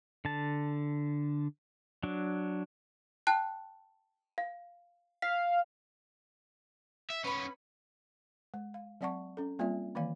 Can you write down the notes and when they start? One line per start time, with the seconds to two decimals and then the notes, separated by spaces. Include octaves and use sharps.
0.25 D3 A5
2.03 F#3 D4
3.27 G5 A5 F#6
4.38 F5
5.22 F5 B6
7.10 E5
7.24 B3 C#4 B4 B5
8.54 G#3
8.74 F5
9.01 F#3 C4 D5 F#5 A5 C#6
9.37 C#4 A4
9.59 G3 A#3 C4 F4 D5 E5
9.95 D#3 E3 A#3 D5 F5